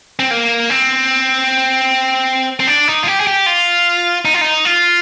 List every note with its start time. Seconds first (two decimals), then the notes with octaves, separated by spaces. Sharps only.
0.19 C4
0.31 A#3
0.70 C4
2.60 C4
2.67 D4
2.88 D#4
3.03 F4
3.08 G4
3.20 G#4
3.27 G4
3.46 F4
4.25 D#4
4.34 F4
4.41 D#4
4.65 F4